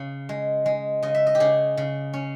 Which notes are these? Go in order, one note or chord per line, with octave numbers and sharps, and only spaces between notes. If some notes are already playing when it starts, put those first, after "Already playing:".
Already playing: C#3
G#3
G#3
C#3 D#5
E5
D#5
G4
C#3 G#4
C#3
C#4